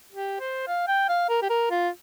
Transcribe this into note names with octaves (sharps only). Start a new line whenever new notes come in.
G4
C5
F5
G5
F5
A#4
G4
A#4
F4